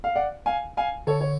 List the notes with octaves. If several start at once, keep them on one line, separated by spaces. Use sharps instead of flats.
F5
D5 F#5
F5 G#5
F5 G#5
D3 A4 C#5
C#5